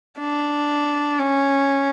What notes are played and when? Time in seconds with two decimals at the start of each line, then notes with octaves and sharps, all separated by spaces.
0.19 D4
1.19 C#4